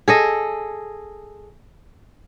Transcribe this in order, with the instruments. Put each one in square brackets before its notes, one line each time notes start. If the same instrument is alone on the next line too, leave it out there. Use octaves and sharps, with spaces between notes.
[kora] G#4 A4 D#5